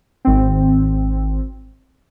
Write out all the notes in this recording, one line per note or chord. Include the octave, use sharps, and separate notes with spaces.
G#1 C4